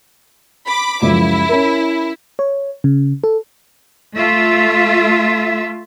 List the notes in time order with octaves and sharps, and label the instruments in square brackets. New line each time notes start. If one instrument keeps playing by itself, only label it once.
[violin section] B5 D6
[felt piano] C#2 F#2 F3 [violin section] E4
[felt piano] C#4 A#4
[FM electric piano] C#5
C#3
A4
[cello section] A3 F4 E5